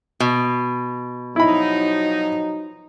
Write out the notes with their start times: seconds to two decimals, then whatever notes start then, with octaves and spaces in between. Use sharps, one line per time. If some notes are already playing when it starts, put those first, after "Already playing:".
0.20 B2
1.36 F3 F#3 D#4 E4 B5